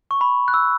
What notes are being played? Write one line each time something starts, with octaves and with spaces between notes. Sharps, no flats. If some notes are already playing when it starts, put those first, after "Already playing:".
C#6
B5
F#6
E6